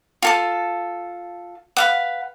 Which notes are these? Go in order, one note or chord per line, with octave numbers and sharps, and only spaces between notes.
F4 A4 A5
B4 F5 F#5